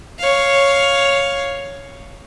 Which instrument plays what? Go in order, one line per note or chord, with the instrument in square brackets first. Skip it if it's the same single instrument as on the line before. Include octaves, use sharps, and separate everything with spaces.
[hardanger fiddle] C#5 F5